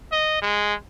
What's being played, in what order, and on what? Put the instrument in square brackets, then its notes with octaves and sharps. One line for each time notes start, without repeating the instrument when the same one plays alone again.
[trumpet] D#5
G#3